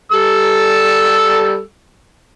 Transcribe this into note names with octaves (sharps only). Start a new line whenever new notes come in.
G3 A4 E6